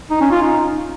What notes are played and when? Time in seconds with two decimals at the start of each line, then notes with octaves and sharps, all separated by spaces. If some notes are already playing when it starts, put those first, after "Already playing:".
0.10 D#4
0.21 C#4
0.31 F4
0.42 D#4